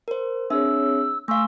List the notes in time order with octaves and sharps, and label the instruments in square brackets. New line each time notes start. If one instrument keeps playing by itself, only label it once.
[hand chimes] A#4 C5
[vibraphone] C4 G#4 C#5 [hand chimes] D4 E5 [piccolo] E6
[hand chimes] A3 F5 [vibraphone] G#5 C6 C#6 [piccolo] E6